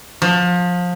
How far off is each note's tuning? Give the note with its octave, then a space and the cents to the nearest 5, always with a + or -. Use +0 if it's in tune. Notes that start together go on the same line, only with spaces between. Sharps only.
F3 +25